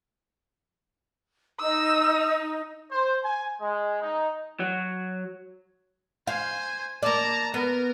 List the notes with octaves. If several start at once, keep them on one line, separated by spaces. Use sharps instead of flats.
D#4 E6
C5
G#5
G#3
D#4
F#3
C5 F5 G#5
A#3 D5 A5 A#5
B3 A#4